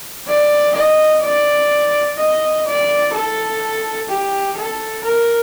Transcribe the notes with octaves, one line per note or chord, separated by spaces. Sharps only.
D5
D#5
D5
D#5
D5
A4
G4
A4
A#4